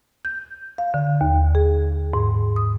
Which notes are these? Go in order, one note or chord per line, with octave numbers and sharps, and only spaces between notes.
G6
F5
D3
D#2
G#4
G#2
D#6